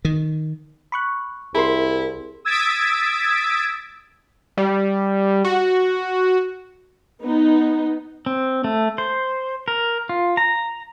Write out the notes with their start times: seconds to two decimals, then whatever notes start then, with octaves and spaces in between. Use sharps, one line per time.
0.05 D#3
0.92 B5 C#6 F#6
1.54 C2 E4 G#4 A#4 C6
2.45 D#6 E6 G#6 A6 B6 D7
4.57 G3
5.44 F#4
7.21 B3 D#4
8.26 C4
8.64 A3
8.98 C5
9.68 A#4
10.09 F4
10.37 A#5